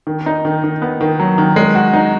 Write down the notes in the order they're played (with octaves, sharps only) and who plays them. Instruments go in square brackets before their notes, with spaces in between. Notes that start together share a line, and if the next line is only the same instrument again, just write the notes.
[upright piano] D#3
D#4
D#3
D#3
B3
D#3
F#3
D#3
G#3
F#4
D#4